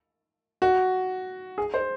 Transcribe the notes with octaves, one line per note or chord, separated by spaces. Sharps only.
F#4
G#4
C5